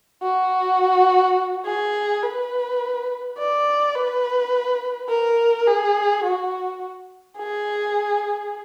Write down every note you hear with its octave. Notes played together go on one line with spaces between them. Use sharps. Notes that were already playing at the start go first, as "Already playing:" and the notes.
F#4
G#4
B4
D5
B4
A#4
G#4
F#4
G#4